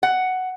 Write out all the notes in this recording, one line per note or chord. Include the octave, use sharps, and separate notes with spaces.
F#5